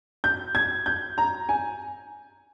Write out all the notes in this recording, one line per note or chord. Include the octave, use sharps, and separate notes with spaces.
G6
G#6
G6
A#5
G#5